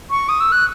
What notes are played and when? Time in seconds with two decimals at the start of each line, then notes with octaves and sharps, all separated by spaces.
0.11 C#6
0.29 D#6
0.40 E6
0.52 F#6